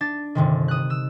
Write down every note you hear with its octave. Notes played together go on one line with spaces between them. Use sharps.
D4 A6
G1 C3 D#3
D#6 F#6
E6